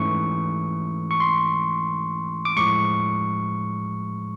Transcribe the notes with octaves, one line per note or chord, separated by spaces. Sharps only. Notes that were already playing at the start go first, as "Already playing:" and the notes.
Already playing: G#2 E3 A3 C#4 C#6
C#6
C6
D6
A2 F3 G#3 C#6